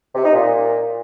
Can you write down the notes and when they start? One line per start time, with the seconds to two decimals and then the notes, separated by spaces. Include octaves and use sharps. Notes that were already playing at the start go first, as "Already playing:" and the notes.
0.15 C3
0.24 D#4
0.33 A#2